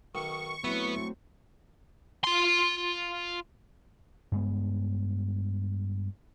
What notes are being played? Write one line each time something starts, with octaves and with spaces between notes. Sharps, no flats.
B1 D#3 C#6
F#3 A3 B3 C4 E4
F4 C6
G2 G#3 B3